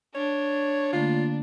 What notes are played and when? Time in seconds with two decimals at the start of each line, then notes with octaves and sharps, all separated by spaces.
0.15 D4 C#5
0.93 D3 A3 A#3 F4